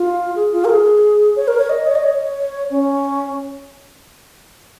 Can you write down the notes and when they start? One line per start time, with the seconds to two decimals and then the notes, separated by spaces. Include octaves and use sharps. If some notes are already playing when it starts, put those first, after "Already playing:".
Already playing: F4
0.36 G#4
0.53 F4
0.65 A#4
0.70 G#4
1.36 C#5
1.48 A#4
1.58 C#5
1.70 D#5
1.87 C#5
1.95 D#5
2.04 C#5
2.71 C#4